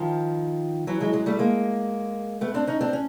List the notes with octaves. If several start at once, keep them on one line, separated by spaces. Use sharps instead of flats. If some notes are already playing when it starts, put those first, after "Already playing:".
Already playing: D#3 F3
E3 F#3
F#3 G#3
F#3 G#3
G3 A3
G#3 A#3
A3 B3
C4 D4
C#4 D#4
C4 D4
C#4